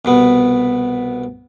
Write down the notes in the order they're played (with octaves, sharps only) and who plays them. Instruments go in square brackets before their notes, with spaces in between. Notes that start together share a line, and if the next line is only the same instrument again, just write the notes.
[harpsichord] C2 B2 B3